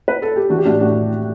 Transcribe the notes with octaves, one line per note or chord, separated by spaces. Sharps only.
B4
A4
G4
E3 D4 F#4
G4
A2 D4 F#4
A2 D4 F#4